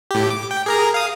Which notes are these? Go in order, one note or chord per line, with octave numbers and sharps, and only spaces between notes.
A2 G4
D6
G5
G#4 A#4 A#5
F5 D#6